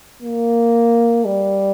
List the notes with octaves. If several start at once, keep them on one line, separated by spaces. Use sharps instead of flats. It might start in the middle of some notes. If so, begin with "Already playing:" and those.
A#3
G3